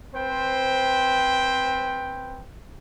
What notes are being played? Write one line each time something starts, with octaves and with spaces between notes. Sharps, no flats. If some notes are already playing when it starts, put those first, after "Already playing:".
C4 B4 C5 G5